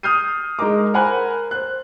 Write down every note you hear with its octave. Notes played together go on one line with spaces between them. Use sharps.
D#6 F6 G6 C7 D#7
G#3 D#4 A#4 A#5 D6
A#4 C5 F#5 G#5 B5 F#6
C5 F#6